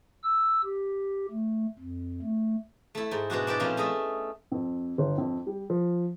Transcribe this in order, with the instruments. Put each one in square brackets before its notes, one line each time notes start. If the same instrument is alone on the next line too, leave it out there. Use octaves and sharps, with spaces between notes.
[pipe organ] E6
G4
A3
F2
A3
[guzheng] A3 E4
G#2
B2 G#3 D4 F#4
D4 E4 G4 D5
F2 A#2 C#4 E4 A#4
A3 G#4 D#5 E5
[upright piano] F2
G1
F2
G3
F3